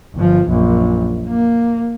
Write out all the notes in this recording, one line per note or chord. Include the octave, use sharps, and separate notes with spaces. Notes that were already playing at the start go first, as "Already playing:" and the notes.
G1 F3
A#1 F#2
A#3